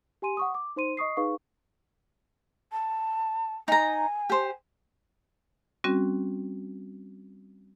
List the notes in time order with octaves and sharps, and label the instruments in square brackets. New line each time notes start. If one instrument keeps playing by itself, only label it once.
[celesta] G4 G#5 C6 D#7
F#5 C#6 D#6
D6
D#4 C5 C6 D#7
D#5 C#6 D#6 C7
D#4 G#4 B4 F5 C#6
[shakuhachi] A5
[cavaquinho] D#4 A#5 [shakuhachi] G#5
[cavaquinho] G4 C5
[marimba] G3 C4 C#4 F#4